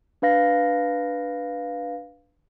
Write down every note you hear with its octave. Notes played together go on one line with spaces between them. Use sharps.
D4 B4 F5 A#6